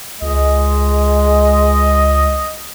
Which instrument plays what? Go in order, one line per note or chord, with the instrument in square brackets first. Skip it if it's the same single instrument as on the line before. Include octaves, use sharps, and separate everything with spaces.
[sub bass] C#2 [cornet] G#3 [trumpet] D#5